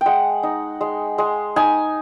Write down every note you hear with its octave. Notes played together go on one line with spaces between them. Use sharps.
G#3 F#5 G5
D#4
G#3
G#3
D#4 G#5